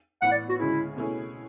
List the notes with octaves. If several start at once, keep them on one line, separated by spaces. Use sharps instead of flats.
A2 E3 B3 E4 F#5
D5
F#4
D2 C#3 G#3 C#4 E4 G#4
B2 A3 C#4 E4 G#4